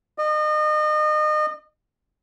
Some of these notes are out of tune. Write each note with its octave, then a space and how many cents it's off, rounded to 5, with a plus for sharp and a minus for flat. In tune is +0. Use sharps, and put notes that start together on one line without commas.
D#5 -35